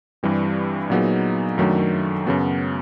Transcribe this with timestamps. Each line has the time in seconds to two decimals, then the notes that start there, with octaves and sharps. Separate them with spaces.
0.23 G2 E3 G3 C4
0.90 A#2 F#3 B3 D#4 G#4
1.58 F#2 D#3 F#3 A3 D4
2.26 F#2 C#3 F#3 B3